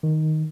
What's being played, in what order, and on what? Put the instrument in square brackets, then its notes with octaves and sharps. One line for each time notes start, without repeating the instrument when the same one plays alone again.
[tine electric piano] D#3